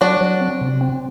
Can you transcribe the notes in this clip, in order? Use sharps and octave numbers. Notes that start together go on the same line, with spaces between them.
F#3 D4 F#4
F#3
C4
C3
C4